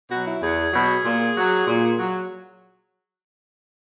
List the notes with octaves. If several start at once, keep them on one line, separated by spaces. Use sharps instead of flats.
B2 F#3 F#4
E4
E2 G#4
B2 F#3
A#2
F#3
A#2
F#3